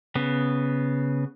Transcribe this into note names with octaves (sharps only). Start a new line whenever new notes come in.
C#3 B3